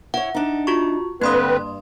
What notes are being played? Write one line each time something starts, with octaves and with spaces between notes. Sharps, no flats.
E4 C#5 F#5
D4 D#4
F4 F#4 C#6
G2 D3 A#3 C4 B4 C6 D#6